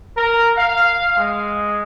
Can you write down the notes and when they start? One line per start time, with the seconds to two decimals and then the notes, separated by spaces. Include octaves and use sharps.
0.17 A#4
0.57 F5
1.17 G#3